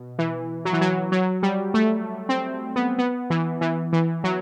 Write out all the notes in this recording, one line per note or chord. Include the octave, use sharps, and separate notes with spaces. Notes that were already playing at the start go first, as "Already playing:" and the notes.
Already playing: B2
E3
F#3
E3
F#3
F#3
G3
A3
C4
B3
B3
E3
E3
E3
F#3